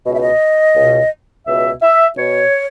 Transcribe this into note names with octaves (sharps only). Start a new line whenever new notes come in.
C#2 B2 D#5 E5
D#5
C#2 B2
C#2 B2 E5
E5
B2 C#5